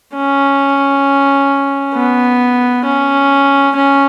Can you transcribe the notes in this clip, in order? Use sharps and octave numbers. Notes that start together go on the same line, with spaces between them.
C#4
B3
C#4
C#4